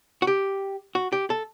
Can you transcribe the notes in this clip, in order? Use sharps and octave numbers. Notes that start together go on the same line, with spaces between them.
F#4
G4
F#4
G4
A4